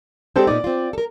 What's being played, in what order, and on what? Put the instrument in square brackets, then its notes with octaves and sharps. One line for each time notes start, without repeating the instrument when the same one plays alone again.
[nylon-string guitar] G#3 D4 G4 [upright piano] C4 A4 C5
[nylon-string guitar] A#2 B3 D#4 [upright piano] D5
[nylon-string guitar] C4 F4
A4 A#4